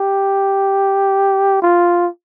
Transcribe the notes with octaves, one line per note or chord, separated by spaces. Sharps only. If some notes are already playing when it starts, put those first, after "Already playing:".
Already playing: G4
F4